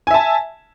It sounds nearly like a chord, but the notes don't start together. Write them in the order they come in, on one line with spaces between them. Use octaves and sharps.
G#5 E5 A5